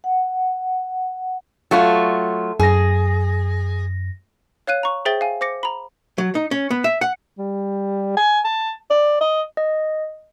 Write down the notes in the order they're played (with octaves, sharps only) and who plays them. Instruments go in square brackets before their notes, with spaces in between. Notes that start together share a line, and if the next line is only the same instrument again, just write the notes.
[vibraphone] F#5
[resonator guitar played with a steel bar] F#3 A3 F4
[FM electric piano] F#2 A#6 [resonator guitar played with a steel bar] G#4
[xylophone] C#5 F5 F#6 D#7
A#5 C#6
G#4 C5 E5 G5 A6 G7
F5 G#5
C5 D6 A#6 C#7
A#5 B5
[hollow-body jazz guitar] F#3
D#4
C#4
B3
E5
F#5
[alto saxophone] G3
G#5
A5
D5
D#5
[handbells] D#5